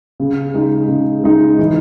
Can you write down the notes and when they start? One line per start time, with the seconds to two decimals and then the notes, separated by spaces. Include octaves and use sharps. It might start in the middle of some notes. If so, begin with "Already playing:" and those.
0.20 C#3
0.54 G#3 D#4
0.88 C#3
1.24 G#3 D#4
1.59 E3